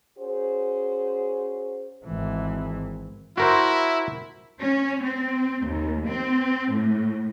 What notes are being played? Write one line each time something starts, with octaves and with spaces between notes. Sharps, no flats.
C#4 F#4 G#4 C5
G#1 E3
E4 F#4 A#4 C5
C#4
C4
D#2
C4
A2